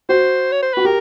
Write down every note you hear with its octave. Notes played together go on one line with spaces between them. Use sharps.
F#4 C5
C#5
C5
F#4 B4
G4 A#4